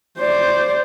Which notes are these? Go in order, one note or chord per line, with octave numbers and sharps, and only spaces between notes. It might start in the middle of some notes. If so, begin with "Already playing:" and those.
C5 D5